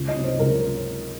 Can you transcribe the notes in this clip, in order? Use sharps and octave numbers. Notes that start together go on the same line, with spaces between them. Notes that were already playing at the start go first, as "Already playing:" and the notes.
Already playing: C#2
D#5
C3 F#3
C5
C#2 A#4